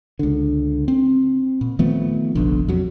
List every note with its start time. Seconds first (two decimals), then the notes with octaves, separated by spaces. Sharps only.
0.19 C#2 D3
0.88 C4
1.61 A#2
1.79 D#3 F3 A3 B3
2.35 F1 A#1 D3
2.68 F2 F#3